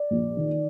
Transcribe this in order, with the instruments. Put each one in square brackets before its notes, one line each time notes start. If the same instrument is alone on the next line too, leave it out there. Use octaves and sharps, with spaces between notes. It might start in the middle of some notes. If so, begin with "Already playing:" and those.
Already playing: [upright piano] D5
A#1
D#3